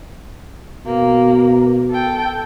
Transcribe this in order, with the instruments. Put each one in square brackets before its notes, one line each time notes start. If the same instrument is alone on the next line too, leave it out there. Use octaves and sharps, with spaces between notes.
[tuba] B2 [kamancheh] A#3
[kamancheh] A4 G5